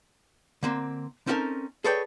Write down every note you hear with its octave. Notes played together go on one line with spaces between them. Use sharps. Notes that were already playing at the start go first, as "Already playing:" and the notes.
D3 A#3 C4
C4 C#4 D#4 F#4 A4 A#4
G#4 A4 B4 C#5 D5 G5